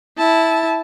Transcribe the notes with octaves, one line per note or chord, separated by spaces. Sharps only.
E4 A5